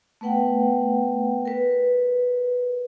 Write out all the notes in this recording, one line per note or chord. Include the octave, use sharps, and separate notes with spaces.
A3 B3 B4 F#5 G5
A#4 B4